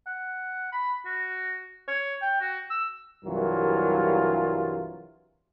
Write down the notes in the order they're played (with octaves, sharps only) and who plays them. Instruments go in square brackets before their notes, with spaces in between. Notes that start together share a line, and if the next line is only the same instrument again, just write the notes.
[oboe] F#5
B5
F#4
C#5
G5
F#4
E6
[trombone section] C2 G2 E3 F#3 F4 A#4